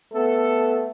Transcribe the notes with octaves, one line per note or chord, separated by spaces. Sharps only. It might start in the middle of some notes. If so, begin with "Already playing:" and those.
A3 B3 A4